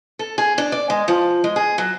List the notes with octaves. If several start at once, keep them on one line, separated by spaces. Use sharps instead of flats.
A4
G#4
D4
D5
G#3
F3
G#3
G#4
F#3